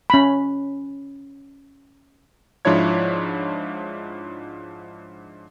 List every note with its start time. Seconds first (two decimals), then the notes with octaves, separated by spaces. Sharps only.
0.10 C#4 B5
2.65 G#2 F3 D4 E4 C#5 G#6